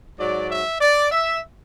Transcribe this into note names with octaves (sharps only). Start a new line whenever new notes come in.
G#2 F#3 D5
E5
D5
E5